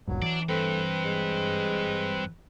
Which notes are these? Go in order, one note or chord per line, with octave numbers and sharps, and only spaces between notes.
D1 A#1 G2 F#3
E3 D4 D5
G2 A3 C4 B4
G#3